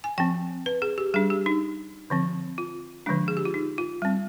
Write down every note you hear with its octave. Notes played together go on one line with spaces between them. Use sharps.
G#5
F3 C4 G5
B4
G#4
G4
G3 D4 G#4
G4
D#4
D3 F3 C4
F4
D3 F3 G#3 D4
G#4
G4
F4
D#4
F4
G3 C4